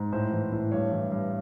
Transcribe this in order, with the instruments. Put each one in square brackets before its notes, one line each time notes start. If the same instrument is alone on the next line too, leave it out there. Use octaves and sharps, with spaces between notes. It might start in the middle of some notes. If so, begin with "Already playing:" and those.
Already playing: [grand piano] G#2
A2 C5
E3
A2
G2 C#5
E3
G2